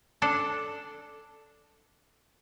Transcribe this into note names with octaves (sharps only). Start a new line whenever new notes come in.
D4 A4